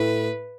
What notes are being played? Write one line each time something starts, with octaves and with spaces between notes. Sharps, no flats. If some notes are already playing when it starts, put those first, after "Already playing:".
Already playing: A2 A3 B4